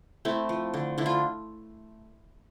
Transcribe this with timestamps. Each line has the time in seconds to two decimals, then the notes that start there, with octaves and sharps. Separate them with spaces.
0.25 A3 C4 E4
0.49 F3
0.74 D3
0.98 D3 E4
1.06 F4